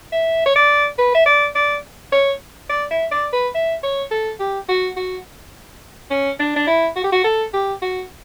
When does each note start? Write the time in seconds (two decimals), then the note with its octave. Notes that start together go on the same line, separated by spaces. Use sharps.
0.12 E5
0.46 C#5
0.56 D5
0.99 B4
1.15 E5
1.26 D5
1.55 D5
2.12 C#5
2.70 D5
2.91 E5
3.11 D5
3.33 B4
3.55 E5
3.83 C#5
4.11 A4
4.40 G4
4.69 F#4
4.97 F#4
6.11 C#4
6.39 D4
6.57 D4
6.67 E4
6.96 F#4
7.04 G4
7.12 F#4
7.24 A4
7.54 G4
7.82 F#4